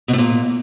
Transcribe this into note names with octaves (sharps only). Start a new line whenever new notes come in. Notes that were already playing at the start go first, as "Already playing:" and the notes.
B2
A2
A#2